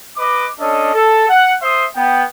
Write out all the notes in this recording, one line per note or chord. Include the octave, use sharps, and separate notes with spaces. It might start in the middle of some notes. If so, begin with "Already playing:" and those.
B4 D#5 D6
C#4 D4 A4 D#5
A4
F#5
C5 E5 C6 D#6
B3 G5